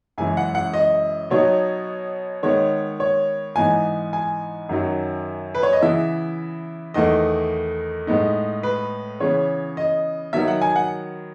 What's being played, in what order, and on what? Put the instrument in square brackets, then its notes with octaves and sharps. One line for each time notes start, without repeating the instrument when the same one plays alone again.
[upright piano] F#2 C#3 E3 G#3 G#5
F#5
F#5
D#5
B2 F#3 B3 D#4 C#5
D#3 G#3 B3 C#5
C#5
G#2 E3 B3 D#4 G#5
G#5
F#2 D#3 F#3
B4
C#5
D#5
C#3 E3 B3 E4 E5
E2 D#3 A3 E4 D#5
A2 G#3 B3 D#4
B4
C#3 E3 B3 C#5
D#5
D#3 F#3 B3 E5
F#5
G#5
F#5